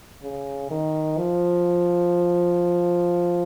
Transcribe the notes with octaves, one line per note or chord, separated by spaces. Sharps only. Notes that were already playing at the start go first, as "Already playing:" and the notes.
C#3
D#3
F3